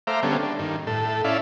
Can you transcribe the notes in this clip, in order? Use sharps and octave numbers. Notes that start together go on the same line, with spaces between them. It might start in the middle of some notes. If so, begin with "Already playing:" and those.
A3 C5 E5 F5 A#5 D6
D3 G3 A3 B3 C#4
D4
G2 D#3
A2 A4
C#4 E4 D5 E5 F5